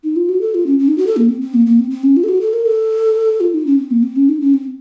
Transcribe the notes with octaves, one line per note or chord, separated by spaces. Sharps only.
D#4
F4
F#4
A4
F4
C#4
C#4
D#4
F#4
A4
A#3
C4
C4
A#3
A#3
C4
C4
C#4
F4
A4
F#4
A4
A#4
A4
F4
D#4
C#4
C4
A#3
C4
C#4
D#4
C#4
C4